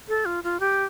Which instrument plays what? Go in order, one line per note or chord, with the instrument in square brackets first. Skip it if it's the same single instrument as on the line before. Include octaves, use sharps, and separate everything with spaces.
[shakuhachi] A4
F4
F4
G4